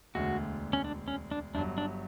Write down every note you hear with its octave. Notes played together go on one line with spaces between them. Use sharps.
E1 D2 D3 F#4
C#4
D4
C#4
D4
G1 G2 F#3 D4
D4